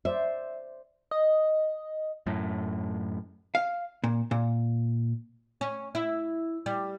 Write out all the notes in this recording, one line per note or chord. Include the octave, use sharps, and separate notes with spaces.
C5 D5 E5
D#5
F#2 A2
F5
A#2
A#2
C#4
E4
G3